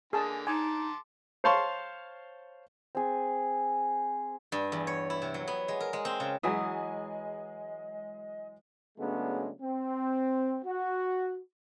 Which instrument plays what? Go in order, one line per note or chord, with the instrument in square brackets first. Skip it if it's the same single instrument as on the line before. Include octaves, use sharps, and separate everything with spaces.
[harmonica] D3 A#3 G#5 [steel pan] G#4 A5
[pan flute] D#4 [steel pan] G#5 [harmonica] A5 C6 D6
[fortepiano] C5 C#5 F5 A5 C6 C#6
[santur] C4 G#4
[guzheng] G2
E2
C#5
E4
C3
F#3
B3
G#3
A#4
G#3
C4
C#3
[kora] E3 F#3 E4 [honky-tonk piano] G#3 G#5 D#6 [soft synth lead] D#5
[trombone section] C#3 F#3 G#3 A3 B3 D4
C4
F#4